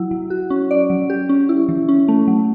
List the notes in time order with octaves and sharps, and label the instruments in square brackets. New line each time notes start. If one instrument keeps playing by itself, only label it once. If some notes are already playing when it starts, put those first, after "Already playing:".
Already playing: [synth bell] F#3 E4
F#3
F#4
C#4
D5
F#3
G4
C#4
E4
E3
C#4
A3
F#3